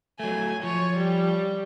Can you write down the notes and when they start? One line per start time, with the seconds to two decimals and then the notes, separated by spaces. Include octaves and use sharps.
0.20 F#3 A3 G#5
0.63 F3 C#5
0.97 G3